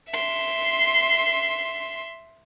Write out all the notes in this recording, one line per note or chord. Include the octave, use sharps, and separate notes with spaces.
E5 C6